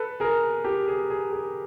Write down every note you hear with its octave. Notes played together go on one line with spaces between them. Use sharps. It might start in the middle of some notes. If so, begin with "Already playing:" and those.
Already playing: A4 B4
G#4 A#4
G4 A4
G#4
G#4
G#4